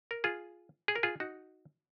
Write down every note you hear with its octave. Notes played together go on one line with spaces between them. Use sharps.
A#4
F4 G#4
G#4
A#4
F4 G#4
D#4 F#4